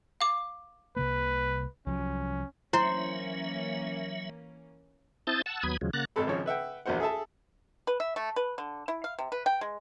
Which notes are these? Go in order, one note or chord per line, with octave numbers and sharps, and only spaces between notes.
F5 D6
C2 C3 A#3 B4
C2 F3 F#3 C#4
E3 F#3 A#3 C#4 E4 C5 E5
C4 E4 A5 D#6 G6 A6
F#5 A5 E6
D#2 F#3 B3 B5 D#6 G#6
D#2 C#3 F3 F#3 G#3
C#3 A#3 F#5 A#5 F#6 A6
G#1 G#2 C3 A4 B5
G#1 C#3 F3 C#5
B4 E5 F#5 G5
A#1 E2 F#4 C5 F#5
G#4 A4 E5 A5
B4
E5
A3
B4
D3
E4
F5
C3
B4
G5
G#3